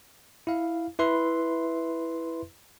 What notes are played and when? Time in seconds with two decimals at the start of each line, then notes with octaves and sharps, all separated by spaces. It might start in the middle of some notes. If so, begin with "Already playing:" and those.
0.47 E4 F5
0.99 E4 B4 E5 C6